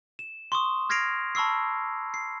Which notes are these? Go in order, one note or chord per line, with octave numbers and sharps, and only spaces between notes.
E7
C6 C#6 D#6
F6 G#6 A#6 C7 D7 F7
A5 B5 C#6 E6 C7
C7